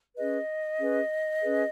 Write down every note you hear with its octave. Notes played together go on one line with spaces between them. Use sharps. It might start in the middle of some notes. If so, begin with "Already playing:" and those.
C#4 G#4 B4 D#5
C#4 G#4 B4
C#4 G#4 B4